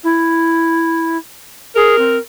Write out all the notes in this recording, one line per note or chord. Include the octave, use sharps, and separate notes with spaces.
E4
G#4 A#4
C4